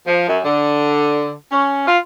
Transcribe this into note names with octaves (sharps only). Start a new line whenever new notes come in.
F3
F#2
D3
C#4
F4